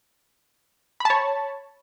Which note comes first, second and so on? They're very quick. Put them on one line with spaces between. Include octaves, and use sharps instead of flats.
B5 A5 C#5